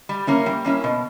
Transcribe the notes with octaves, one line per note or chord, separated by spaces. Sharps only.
G3
A#3 C#4 E4
G3
A#3 C#4 E4
B2